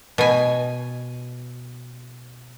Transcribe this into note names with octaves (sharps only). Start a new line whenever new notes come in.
B2 G#5